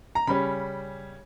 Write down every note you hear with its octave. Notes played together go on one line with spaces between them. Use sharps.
A#5
C#3 G3 C#4 B5